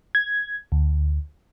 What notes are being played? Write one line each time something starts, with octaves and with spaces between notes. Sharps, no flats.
G#6
D2